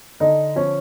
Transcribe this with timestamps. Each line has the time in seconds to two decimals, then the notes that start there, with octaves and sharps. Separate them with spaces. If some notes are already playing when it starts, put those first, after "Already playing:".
0.20 D3 D#4
0.56 F3 C#4